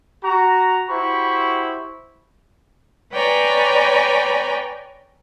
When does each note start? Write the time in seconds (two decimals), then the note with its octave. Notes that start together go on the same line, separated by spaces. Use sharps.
0.24 F#4 A#5
0.90 E4 F#4 G4 C5 B5 C#6
3.14 B4 C#5 D5 G5 G#5 A#5